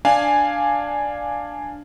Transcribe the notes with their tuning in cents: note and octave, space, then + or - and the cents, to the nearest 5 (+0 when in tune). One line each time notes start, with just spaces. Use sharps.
D4 +0 F5 +0 G#5 +0